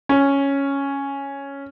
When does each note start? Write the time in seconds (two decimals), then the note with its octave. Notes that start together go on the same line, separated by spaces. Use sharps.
0.09 C#4